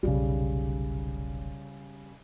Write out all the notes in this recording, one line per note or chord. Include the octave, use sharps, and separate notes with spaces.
F1 B1 C#3 G3